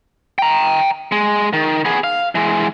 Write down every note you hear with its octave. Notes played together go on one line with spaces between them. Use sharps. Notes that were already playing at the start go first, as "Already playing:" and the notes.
G5 A#5
G#3
D#3
B3 G#4
F5
E3 G#3